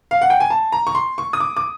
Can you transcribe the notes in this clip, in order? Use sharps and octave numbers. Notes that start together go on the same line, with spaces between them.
F5
F#5
G5
G#5
A5
A#5
C#6
C6
C#6
D#6
D6
D6